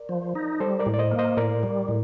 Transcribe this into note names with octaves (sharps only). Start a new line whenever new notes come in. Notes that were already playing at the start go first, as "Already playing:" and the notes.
Already playing: A#4 D5
F3
D#4
G3 A4 C5
A#4 D5
A2
D5
C5 D#5
A#3
C5 D#5
A2 A#4 D5
G3
A2